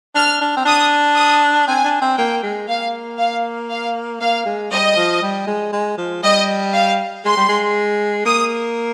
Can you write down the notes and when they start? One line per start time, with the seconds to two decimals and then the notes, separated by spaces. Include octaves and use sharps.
0.15 D4 F6
0.41 D4
0.57 C4
0.65 D4 D#6
1.16 D#6
1.68 C4 G#5
1.85 D4
2.02 C4
2.17 A#3 G5
2.43 G#3
2.68 A#3 F5
3.19 F5
3.69 F5
4.21 A#3 F5
4.45 G#3
4.72 G3 D#5
4.96 F3
5.22 G3
5.47 G#3
5.73 G#3
5.98 F3
6.23 G3 D#5
6.75 F5
7.25 G#3 C6
7.37 G3
7.49 G#3
8.25 A#3 D#6